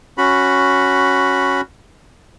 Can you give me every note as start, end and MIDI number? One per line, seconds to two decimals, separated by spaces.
0.18 1.61 61
0.18 1.61 66
0.18 1.61 83